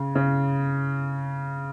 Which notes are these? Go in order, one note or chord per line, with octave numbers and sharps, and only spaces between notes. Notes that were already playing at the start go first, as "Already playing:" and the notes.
Already playing: C#3
C#3